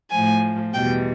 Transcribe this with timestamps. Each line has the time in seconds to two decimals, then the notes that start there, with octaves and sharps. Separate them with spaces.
0.11 A2 F3 G#5
0.74 E2 B2 G3 G5